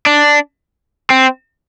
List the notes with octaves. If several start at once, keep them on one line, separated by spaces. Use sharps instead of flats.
D4
C4